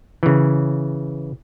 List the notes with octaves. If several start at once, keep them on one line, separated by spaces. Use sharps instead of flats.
C#3 E3